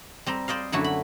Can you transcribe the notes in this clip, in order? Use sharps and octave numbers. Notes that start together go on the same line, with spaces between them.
G3 C4 A#5
C5 D5 D#5 F5
F#2 D3 F#3 A3 E4 F#4
B5